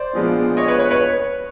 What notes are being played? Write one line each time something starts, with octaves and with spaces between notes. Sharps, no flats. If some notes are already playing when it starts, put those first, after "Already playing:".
Already playing: C5 D5
A#2 F3 G#3 B3 D4
C#5 D#5
B4 C#5
B4 C#5
B4 C#5